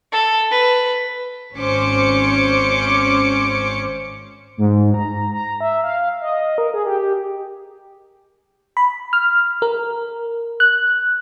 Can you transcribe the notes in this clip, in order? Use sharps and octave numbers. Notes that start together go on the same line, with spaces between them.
A4
B4
G#1 C#4 C5 D6 C#7
G#2
A#5
A#5
E5
F5
D#5
A#4
G#4
G4
B5
F6
A#4
F#6